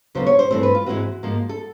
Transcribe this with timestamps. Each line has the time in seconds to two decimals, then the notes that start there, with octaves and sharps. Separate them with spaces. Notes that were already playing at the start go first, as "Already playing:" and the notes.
0.15 D2 C#3 F#3 B3 C5
0.27 C#5
0.39 C5
0.51 G2 E3 A3 C4 C5
0.63 B4
0.75 F4
0.86 G#2 E3 G#3 C4 F#4
1.23 G#2 F3 A#3
1.49 A4